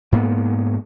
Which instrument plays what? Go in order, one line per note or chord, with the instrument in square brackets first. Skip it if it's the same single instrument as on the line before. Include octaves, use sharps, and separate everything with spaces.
[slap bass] G#2 A#3 B3